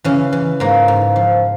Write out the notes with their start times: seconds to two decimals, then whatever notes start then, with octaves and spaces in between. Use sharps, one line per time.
0.04 C#3 E3 C#4
0.33 E3
0.60 G#2 A#3
0.88 G#2
1.16 F3